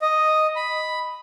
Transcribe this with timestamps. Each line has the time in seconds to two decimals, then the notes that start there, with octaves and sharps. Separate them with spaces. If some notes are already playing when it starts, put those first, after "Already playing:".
0.02 D#5
0.56 B5